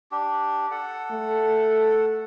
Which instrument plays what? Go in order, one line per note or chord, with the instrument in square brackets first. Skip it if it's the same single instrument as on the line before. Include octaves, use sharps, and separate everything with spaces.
[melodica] D4 G4
A4 F#5
[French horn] A3